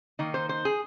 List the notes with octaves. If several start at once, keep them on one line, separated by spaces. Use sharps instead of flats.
D#3 A#3 D#4
C5
C5
G#4